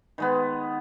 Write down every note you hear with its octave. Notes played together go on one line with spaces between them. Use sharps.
D#3 G#3 B3